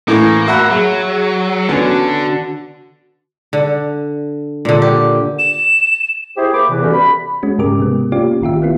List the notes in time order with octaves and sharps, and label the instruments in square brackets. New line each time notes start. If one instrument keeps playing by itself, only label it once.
[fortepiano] A2 E3 [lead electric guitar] A#3
[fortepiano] F#4 E5 F#5 [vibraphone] B5
[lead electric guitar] F#3 [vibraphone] G#4
[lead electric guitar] D3 D4 [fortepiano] B3 C#4 [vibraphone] F#4
[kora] D3
A#2 D3
G4
[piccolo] E7
[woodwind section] E4 G4 G#4 C5
A#3 C5 B5 D6
E2 C3 E3
G3 A3 B3 C#4 F#4 G4
B5
[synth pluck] G#3 C#4 F#4
G#2 C#3 G#3 G4 A#4 D6
C3 G#3 B3
A#3 C#4 F4 G4 D5
A1 D#3 F4 G4 E5
A#3 B3 E4 F4